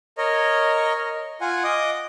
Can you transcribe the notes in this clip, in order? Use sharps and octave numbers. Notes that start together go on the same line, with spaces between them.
A#4 C#5 D#5
F4 F#5 G#5
D#5 D6 D#6